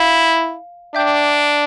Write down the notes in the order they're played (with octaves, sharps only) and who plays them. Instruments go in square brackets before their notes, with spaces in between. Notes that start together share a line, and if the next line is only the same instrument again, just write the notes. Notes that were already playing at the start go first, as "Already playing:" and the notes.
Already playing: [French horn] E4 [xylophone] F5
[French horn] D4 [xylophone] E5 G5 D6 G6